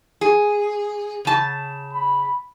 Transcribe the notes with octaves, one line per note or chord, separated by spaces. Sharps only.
G#4
C#3 A5
B5